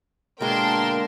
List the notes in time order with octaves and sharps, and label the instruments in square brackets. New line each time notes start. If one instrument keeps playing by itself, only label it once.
[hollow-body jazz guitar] B2 G#3 [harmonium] D3 A#3 [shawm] A#4 [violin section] G5 A5 C6